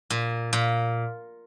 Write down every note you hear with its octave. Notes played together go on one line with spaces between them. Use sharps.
A#2
A#2